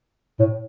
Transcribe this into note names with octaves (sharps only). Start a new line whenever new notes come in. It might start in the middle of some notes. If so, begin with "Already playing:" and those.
A2